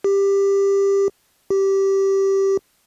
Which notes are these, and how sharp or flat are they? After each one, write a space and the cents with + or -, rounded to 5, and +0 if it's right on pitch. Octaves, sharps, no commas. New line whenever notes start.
G4 +15
G4 -10